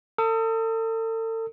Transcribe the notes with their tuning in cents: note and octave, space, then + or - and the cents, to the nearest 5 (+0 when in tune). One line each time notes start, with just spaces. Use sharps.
A4 +40 D#6 +35